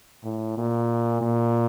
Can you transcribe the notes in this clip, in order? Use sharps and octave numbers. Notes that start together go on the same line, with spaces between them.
A2
A#2
A#2